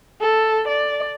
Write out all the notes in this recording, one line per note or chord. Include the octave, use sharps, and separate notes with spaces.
A4
D5